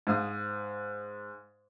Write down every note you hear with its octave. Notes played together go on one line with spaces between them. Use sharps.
G#2 F5 D#6